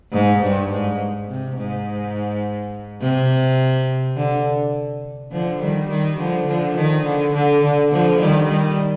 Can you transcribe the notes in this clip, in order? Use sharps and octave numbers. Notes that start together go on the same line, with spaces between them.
G#2
G2
G#2
C3
G#2
C3
D3
D3 F3
D#3 G3
D#3 G3
D3 F3
D3 F3
D#3
D3
D3
D3
D3 F3
D#3 G3
D#3 G3